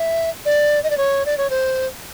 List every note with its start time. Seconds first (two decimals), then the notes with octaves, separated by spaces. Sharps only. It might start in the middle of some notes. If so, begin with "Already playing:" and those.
Already playing: E5
0.46 D5
0.84 D#5
0.90 D5
0.97 C#5
1.26 D5
1.38 C#5
1.50 C5